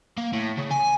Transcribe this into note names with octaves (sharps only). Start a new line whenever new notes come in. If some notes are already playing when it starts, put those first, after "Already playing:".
A#3
A2
C#3
G#5